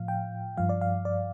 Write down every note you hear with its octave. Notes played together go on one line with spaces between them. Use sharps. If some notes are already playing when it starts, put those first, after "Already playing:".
Already playing: A2 F3 F5
G5
G2 F3 F5
D5
F5
D5